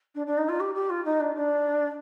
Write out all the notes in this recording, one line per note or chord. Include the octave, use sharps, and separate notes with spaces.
D4
D4
D#4
F4
G4
G4
F4
D#4
D4
D4